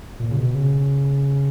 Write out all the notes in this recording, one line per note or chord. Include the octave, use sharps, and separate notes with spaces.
A#2
C#3
B2
C#3